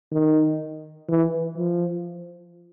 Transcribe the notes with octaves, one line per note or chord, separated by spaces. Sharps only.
D#3
E3
F3